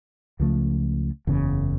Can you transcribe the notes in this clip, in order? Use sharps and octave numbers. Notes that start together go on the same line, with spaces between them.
C#2 C#3 F3 A3
F#1 E2 C#3